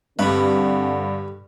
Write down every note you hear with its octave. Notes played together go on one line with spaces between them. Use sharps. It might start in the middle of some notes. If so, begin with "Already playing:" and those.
G2 D3 G3 C4 B4